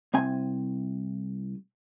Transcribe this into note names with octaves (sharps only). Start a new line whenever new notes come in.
C2 C4 G#5